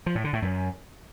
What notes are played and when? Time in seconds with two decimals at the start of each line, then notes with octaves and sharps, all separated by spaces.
0.06 F3
0.15 A2
0.24 D3
0.33 A2
0.42 F#2